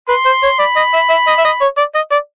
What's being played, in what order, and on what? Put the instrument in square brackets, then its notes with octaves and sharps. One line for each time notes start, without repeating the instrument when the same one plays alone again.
[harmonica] B4 [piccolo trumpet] C6
[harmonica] C5
C#5
[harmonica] D5 [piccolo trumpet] B5
[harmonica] D#5
E5
E5
D#5
E5
D#5
C#5
D5
D#5
D5